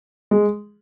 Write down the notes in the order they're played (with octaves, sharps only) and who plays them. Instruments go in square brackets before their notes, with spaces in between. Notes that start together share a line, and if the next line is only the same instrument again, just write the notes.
[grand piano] G#3